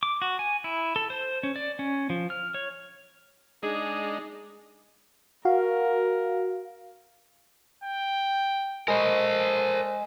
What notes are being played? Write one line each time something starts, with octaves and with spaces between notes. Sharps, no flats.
D6
F#4
G#5
E4
A4
C5
C#4
D5
C#4
F3
F6
C#5
G#3 D4 D#4 G#4
F#4 A#4 F5
G5
G#3 A4 A#4 C5